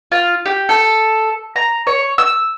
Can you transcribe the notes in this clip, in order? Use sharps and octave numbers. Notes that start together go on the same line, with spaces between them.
F4
G4
A4
A#5
C#5
E6